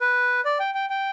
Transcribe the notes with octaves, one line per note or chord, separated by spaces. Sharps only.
B4
D5
G5
G5
G5